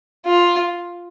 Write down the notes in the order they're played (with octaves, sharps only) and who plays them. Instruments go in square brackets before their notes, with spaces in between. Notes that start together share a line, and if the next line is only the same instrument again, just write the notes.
[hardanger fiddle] F4